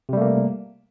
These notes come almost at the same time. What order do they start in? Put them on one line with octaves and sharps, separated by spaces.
C3 G3 A3 A#3